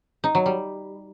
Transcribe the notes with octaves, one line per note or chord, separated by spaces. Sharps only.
D#4
F#3
G3